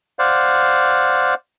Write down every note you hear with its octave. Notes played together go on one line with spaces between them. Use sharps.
C5 D5 F5 F#5